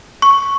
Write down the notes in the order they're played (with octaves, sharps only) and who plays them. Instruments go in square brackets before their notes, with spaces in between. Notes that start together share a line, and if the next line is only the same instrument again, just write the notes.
[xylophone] C#6